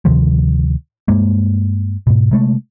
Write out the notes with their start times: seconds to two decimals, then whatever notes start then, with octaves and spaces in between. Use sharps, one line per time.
0.05 D2 C3 D#3 F3
1.08 G2 G#3 A#3
2.07 G#2 B2
2.31 C3 G#3 A3